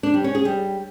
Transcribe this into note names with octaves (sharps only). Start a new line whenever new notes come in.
D4
G3
C#4
G#4
G3